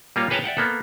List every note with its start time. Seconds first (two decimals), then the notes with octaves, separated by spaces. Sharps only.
0.16 G3 A#3 F4 C#5
0.30 G#4 B4 C#5 G5 A5 A#5
0.44 D5 E5 F#5 G5
0.57 A#3 B3 A4